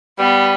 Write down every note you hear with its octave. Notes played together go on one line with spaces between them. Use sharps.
G3 B3